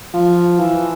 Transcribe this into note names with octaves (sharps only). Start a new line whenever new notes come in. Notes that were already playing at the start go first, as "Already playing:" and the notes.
F3
E3